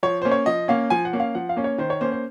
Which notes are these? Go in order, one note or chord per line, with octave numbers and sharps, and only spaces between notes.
F3 C#5
A#3 C#4 C5
C#5
F3 D#5
A#3 C#4 F5
F3 G#5
F#5
A#3 C#4
F5
F3 F#5
F5
A#3 C#4
C#5
D#3 C5
C#5
A#3 C#4 C5
C5